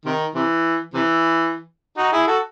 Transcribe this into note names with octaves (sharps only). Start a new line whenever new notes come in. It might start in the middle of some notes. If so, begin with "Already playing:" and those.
C3 D#3
C3 E3
C3 E3
D#4 F#4
E4 G#4
F#4 A4